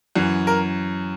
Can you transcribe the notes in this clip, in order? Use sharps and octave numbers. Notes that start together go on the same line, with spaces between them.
F#2 E3
A#4